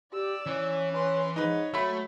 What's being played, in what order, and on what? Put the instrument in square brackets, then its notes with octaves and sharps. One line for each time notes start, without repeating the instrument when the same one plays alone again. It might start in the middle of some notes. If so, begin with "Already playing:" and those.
[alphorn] G4 [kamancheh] D5 E6
[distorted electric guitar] E3 [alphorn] C#4
[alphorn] C#4 [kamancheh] B4 C6
[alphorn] G#2 [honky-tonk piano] D#4 B4 [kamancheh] C#5
[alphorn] F#3 [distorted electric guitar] A3 [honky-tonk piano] E5 B5